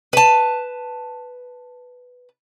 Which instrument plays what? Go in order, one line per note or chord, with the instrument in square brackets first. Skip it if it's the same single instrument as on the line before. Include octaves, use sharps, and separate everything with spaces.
[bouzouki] B4 A5